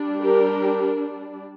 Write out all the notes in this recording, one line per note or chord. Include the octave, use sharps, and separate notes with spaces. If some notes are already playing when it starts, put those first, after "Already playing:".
Already playing: G3 D4
G4 A#4